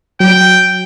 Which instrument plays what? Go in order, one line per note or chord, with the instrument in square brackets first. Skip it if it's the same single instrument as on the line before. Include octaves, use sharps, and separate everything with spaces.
[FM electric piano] F#3 [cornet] G5